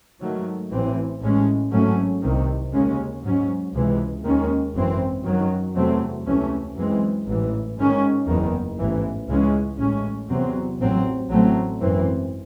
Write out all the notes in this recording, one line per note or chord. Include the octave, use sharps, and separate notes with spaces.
G#2 D#3 F#3 A3
A1 A2 E3 C4
A1 A2 G#3 C#4
G#1 G#2 F#3 A3 C#4
C2 C3 D#3
D#2 C#3 G#3 C#4
G#2 F#3 C#4
C#2 C3 E3 G#3
D#2 D#3 G#3 C#4
G#1 F#2 E3 C4
F#2 D#3 F#3
E2 C3 F#3 A3 C4
C#2 C3 E3 A3 C#4
F#2 E3 G#3 C4
A1 G#2 E3
G#2 D#3 G#3 C#4
F#1 E2 D#3
A1 G#2 E3
C#2 C#3 E3 G#3 C#4
A1 A2 G#3 C#4
E2 C3 F#3 C4
A1 G#2 F#3 C4
A1 A2 F#3 A3 C4
G#1 F#2 E3 C4